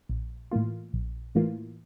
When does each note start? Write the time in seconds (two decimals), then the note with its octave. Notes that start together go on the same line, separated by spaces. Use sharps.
0.09 A#1
0.51 A2 E3 A#3 F4
0.93 A#1
1.35 A2 E3 A#3 F4